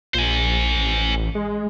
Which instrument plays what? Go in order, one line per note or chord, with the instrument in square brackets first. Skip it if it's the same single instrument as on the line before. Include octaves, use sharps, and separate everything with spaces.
[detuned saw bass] A#1 [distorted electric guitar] C5 G#5
[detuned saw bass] A1
G#3